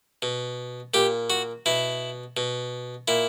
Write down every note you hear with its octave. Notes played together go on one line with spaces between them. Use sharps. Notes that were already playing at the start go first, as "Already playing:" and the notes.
B2
A#2 G4
F#4
B2 E4
B2
A#2 E4